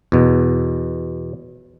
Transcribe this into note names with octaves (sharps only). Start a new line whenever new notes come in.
E2 B2